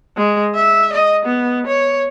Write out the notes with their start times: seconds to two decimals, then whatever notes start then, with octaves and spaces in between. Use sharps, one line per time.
0.17 G#3
0.55 E5
0.93 D#5
1.25 B3
1.67 C#5